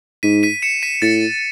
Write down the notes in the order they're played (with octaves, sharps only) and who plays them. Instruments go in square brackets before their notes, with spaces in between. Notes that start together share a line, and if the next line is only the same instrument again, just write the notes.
[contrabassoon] G#2 [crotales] B6 D#7
[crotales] B6 D#7
C#7 E7
B6 D#7
[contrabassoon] A2 [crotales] A6 C#7